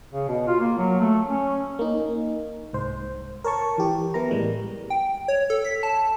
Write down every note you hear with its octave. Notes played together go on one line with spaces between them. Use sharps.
C#3
B2
F4
A#3
F#3
A3
C#4
A#3 D#4
C2 G#2 C5
A#4 C#5 A5 C#6
E3 G4
E3 B3 E4 A#4 A#5
A2 E3 G3 G#3
G5
C#5
A4
B6
A5